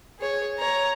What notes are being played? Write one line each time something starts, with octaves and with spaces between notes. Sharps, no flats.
G#4 C#5
C#5 A#5